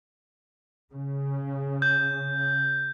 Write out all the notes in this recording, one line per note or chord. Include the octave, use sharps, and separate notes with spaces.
C#3
G6